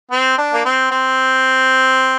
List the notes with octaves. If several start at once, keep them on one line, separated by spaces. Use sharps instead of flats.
C4
D4
A#3
C4
C4